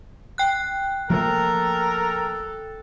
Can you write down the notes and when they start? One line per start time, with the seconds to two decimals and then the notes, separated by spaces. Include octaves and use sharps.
0.38 G5 F#6
1.10 F3 A3 A#3 A4 A#4